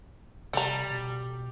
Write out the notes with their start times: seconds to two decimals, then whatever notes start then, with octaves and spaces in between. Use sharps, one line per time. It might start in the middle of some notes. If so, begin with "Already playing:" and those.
0.53 C3 G3 A4 A#5
0.91 B2